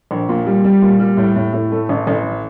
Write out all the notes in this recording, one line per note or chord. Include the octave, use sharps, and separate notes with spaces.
A#1
A#2
G3
G3
A#2
G3
A2
A2
A2
A3
A1
A1